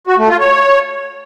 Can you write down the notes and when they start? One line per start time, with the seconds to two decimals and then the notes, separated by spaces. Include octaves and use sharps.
0.07 F#4
0.18 A3
0.29 F4
0.40 C#5